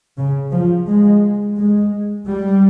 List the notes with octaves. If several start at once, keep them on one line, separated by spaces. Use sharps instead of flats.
C#3
F3
G#3
G#3
G3